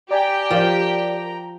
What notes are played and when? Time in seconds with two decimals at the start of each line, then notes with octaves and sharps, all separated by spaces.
0.11 G4 D5 G5 G#5 A#5
0.51 F3 A#4 D5